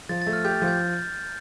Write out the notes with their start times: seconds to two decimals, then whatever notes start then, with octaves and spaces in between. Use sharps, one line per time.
0.09 F3 A6
0.22 A6
0.27 A3
0.33 F6
0.44 G4 G6
0.57 A6
0.62 F3
0.67 G6